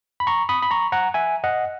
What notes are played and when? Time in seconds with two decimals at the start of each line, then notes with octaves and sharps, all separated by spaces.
0.20 B5
0.27 A#5 C#6
0.49 B5 D#6
0.62 B5
0.71 A#5 C#6
0.92 F#5 A#5
1.14 E5 G#5
1.44 D#5 F#5